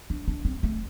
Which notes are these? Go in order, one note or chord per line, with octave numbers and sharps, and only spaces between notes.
D4
D4
C4
A3